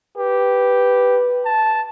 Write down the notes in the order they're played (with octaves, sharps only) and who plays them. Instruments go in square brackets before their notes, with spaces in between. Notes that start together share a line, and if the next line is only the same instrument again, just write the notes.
[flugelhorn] G4 [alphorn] B4
[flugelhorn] A5